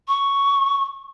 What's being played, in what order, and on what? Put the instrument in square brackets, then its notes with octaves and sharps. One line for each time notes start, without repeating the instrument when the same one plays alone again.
[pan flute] C#6